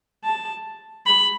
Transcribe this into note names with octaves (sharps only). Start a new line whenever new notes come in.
A5
B5